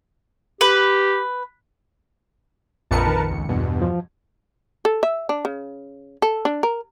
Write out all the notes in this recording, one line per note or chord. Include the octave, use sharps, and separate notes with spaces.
G4 B4
A#1 F2 A#4 B4 A5 C#7
D#3
C#2
E2 G2 B2
F3
A4
E5
D4
C#3
A4
D4
A#4